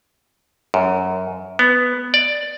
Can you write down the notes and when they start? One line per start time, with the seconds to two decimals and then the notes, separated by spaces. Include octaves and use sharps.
0.74 F#2
1.59 B3
2.14 D5